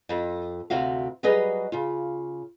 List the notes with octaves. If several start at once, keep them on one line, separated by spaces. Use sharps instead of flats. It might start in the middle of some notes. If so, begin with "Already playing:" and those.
F2
D2 C3 F#4 F5
F#3 G3 G#4 B4 D#5
C#3 F4